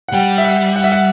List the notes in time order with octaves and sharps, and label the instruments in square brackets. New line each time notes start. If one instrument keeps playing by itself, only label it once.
[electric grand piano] F#5
[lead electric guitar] G3 [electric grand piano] G5
[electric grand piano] E5
F#5
F#5
E5
F#5